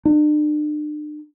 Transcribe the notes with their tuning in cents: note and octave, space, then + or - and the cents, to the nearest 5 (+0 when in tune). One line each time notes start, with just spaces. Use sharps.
D4 +40